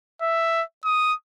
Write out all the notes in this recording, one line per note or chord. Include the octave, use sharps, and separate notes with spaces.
E5
D#6